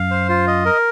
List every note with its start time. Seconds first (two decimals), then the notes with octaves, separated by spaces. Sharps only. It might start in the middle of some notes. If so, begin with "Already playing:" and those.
Already playing: F#2 F5
0.11 C5
0.29 F4
0.47 D#5
0.65 A#4